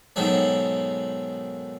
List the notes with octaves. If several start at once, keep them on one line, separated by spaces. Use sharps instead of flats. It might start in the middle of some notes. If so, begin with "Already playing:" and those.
G#2 B2 D#3 F#3 A3 C4